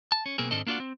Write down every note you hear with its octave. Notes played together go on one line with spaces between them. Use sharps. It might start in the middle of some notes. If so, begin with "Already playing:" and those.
A5
C#4
B1 B2 A#3 C4 G#4
G#2 D#3 C4 D4 A4 D#5
A#3 D4 F4 F#4 D5 F#5
C4